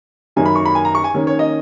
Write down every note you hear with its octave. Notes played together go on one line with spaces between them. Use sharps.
F#2 D#3 A#3 D#4 G#5
B5
C#6
B5
G#5
A#5
C#6
G#5
D#3 A#3 C#4
C#5
D#5